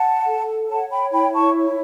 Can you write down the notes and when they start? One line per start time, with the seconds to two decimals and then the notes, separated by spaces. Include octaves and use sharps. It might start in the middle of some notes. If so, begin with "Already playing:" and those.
Already playing: F#5 A5
0.25 A4
0.68 C#5 F#5 A5
0.90 G5 B5
1.11 E4 G5 B5
1.34 A5 C#6
1.56 C#5